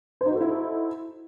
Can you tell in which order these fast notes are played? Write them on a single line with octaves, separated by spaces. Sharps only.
C5 D#4 F#4 A4 E4